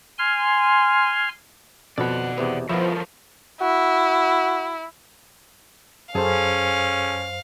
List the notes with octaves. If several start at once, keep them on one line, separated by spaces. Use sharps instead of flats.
G#5 C6 F6
F2 B2 B4 D5 F#5
E2 C3 B3
F3 B3 E4 A4 A#4 C#5 E7
E4 F#4
F#2 C#4 G#4 A4 C5 F5 A5